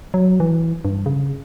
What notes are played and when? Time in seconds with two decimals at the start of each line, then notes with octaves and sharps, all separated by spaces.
0.14 F#3
0.40 E3
0.85 G2
1.06 C#3